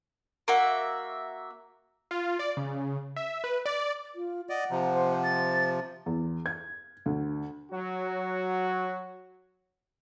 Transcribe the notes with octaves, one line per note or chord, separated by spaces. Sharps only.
A#3 F#4 E5
F4
D5
C#3
E5
B4
D5
F4
D5 D#5 F#5
C3 F3 A#5
C5
A6
E2
G#6
D2
F#3 F#4